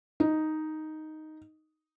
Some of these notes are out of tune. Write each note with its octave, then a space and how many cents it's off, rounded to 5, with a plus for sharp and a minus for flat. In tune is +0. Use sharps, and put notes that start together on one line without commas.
D#4 +0